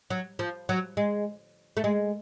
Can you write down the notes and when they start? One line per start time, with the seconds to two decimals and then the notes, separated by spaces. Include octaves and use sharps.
0.10 F#3
0.39 F3
0.69 F#3
0.97 G#3
1.77 A3
1.84 G#3